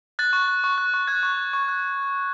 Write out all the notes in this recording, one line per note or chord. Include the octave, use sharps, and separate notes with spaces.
F#6 A6
C#6
F#6
C#6
F#6
C#6
F#6 G#6
C#6
F#6
C#6
F#6